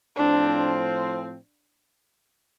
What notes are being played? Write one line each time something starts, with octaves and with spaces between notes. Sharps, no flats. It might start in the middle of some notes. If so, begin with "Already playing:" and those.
A2 F3 C4 D4